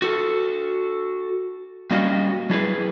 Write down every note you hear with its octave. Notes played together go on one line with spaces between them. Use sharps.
F#4 A4
G3 A#3 C#4 F#4 D#5 F5
F#3 E4 G#4 B4